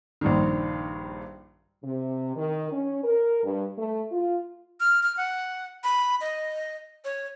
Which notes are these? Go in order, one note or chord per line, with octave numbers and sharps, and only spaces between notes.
A#1 G2 D#3
C3
D#3
C#4
A#4
G2
A3
F4
F6
F6
F#5
B5
D#5
C#5